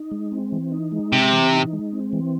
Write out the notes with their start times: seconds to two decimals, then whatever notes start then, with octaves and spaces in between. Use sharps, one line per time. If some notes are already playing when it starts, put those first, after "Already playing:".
Already playing: D#4
0.11 G#3
0.32 C4
0.52 E3
0.72 D#4
0.92 G#3
1.12 C3 C4
1.32 E3
1.53 D#4
1.73 G#3
1.93 C4
2.13 E3